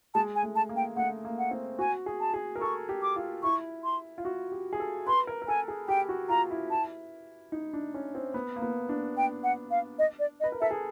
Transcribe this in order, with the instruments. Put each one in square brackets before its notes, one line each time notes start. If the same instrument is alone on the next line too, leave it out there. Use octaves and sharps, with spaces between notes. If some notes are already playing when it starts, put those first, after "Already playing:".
[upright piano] G#3 [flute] A5
[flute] G#5
[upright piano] A3
[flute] A5
[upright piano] A#3
[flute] G5
[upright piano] A3 [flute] F#5
[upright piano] A#3
[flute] F#5
[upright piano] C4
[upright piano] F#4 [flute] G#5
[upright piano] G#4
[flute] A5
[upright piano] G#4
A#4
[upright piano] A4 [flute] C#6
[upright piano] G4
[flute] D6
[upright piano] F4
[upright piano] E4 [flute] C#6
[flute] C6
[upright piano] F4
F#4
G4
G#4
A4
[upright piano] B4 [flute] C6
[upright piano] A#4
A#4
[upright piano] A4 [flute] G#5
[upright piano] G#4
[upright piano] G4 [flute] G5
[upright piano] F#4
[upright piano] F4 [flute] A#5
[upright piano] E4
[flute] A5
[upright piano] D#4
D4
C#4
C4
B3
A#3
B3
D4
[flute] G5
F#5
F5
D#5
D5
D#5
[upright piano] B4
A#4
[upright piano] A4 [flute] E5
[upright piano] G#4